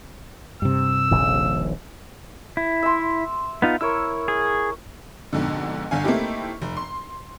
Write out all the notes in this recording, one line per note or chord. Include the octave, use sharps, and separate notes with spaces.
G2 C3 E6
D#1 A#1 D#2
E4
E5 C6
B3 D#4 F4
E4 A#4 C#5 E6
G#4
F2 G#2 B2 D3
G1 D3 F5 G#5
A3 A#3 C4 D#4 E4 G4
F1
C6